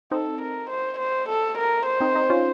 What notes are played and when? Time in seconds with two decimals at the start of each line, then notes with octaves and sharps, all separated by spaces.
0.11 C4 D#4 A4
0.41 A#4
0.70 C5
0.98 C5
1.29 A4
1.58 A#4
1.86 C5
2.00 C4 D#4
2.15 C4 D#4
2.30 C#4 F4